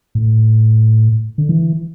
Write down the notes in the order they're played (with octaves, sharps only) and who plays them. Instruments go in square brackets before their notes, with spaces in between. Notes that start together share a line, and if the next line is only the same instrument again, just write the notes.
[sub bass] A2
D3
E3